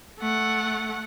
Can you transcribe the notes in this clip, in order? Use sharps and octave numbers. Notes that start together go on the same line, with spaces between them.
A3 F#5